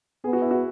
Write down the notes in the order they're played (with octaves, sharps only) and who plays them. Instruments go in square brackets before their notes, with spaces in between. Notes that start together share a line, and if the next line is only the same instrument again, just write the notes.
[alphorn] B3 [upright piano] G#4
[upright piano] F#4
E4
F#4